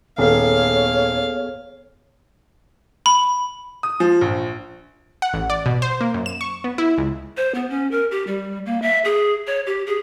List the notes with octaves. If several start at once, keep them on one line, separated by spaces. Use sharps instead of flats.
D#1 B3 G#4 A4 C#5 F5
B5
D#6
F3
A#1
F#5
A1
D5
B2
C5
A#3
F#2
E7
C#6
B3
E4
C#2
C5
B3
C#4
A#4
G4
G3
A#3
E5
G#4
C#5
G4
G#4